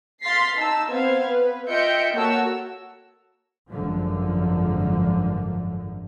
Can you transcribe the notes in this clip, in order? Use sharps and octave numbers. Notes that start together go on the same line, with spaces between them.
F5 C6 A6 B6 C7
D#4 A5 E6
B3 C4 C5 F5 G#6
B4
F4 D#5 E5 G5 G6 C#7
A#3 F#4 A4 C#5 A5 E6
G#1 F#2 D3 F3